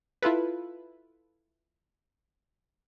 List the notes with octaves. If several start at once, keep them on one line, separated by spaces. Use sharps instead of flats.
E4 F4 A4 B4